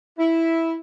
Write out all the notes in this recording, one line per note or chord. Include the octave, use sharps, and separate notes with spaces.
E4